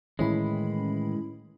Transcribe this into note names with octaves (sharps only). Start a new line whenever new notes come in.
A2 D#3 E3 G#3 C#4 E4 B5